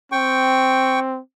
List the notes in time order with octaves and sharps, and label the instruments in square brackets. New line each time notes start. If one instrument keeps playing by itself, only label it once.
[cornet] C4 [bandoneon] G5 C#6